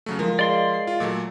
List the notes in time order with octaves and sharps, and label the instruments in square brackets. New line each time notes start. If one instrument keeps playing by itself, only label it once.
[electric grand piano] C#3 F#3 A3
[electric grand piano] F3 [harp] G#3 F4 A#4
[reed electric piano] G#4 D#5 F5 [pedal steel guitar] D5 C6
[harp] C7
[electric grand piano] F4
A#2 F#3 A3